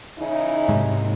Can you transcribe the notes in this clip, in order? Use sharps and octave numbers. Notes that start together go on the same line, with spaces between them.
C#3 E3 D#4 E4
G#2 C3 G#3